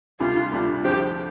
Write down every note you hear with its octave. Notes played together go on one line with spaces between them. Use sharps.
D2 C3 G3 D4 F4
D2 C3 G3 D4
D2 D3 F3 C4 G4